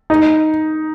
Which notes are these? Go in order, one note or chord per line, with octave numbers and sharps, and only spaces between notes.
D#4